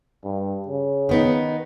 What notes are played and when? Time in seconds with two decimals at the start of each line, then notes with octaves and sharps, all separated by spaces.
0.24 G2
0.68 C#3
1.09 D#3 B3 D#4